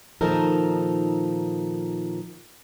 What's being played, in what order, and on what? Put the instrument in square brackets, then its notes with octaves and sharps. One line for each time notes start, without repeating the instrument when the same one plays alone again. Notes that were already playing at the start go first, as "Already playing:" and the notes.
[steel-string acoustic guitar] A#2 D#3 F3 D#4 A4 A#4